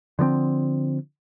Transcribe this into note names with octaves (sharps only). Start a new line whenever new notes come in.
D3 F3 A#3 C4